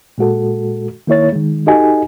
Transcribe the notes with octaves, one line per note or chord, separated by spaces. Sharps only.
A#2 G#3 F#4 A4
D#3 A#3 E4 C#5 A6
D#3 G#3
D#4 F#4 G4 A4 D#5 G#5